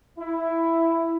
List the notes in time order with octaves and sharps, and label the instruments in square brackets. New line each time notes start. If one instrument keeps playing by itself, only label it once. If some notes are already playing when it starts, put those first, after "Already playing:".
[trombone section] E4